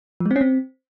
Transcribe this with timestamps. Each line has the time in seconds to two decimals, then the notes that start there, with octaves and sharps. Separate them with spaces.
0.20 F3
0.26 G#3
0.31 C4
0.36 C#4
0.41 C4